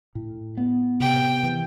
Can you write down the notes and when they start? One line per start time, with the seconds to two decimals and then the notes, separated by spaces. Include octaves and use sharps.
0.15 A2
0.57 B3
1.00 C3 G5
1.43 E3